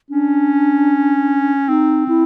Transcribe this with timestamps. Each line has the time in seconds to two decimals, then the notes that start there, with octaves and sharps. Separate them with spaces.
0.10 C#4 D4
1.68 C4 D#4
2.08 E4